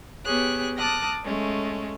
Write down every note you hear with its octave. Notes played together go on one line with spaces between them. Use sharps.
B3 G4 G#4 C#5 F#6
A5 D6 D#6 F6 F#6 A#6
G#3 A3 C#4